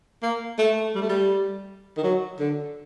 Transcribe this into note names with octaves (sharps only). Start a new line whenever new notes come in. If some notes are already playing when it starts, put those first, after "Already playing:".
A#3
A3
G3
A3
G3
D#3
F#3
D3